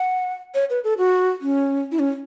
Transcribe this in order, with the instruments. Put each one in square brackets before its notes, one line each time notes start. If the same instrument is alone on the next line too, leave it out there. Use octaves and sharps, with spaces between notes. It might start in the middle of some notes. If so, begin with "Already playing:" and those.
Already playing: [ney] F#5
C#5
B4
A4
F#4
C#4
E4
C#4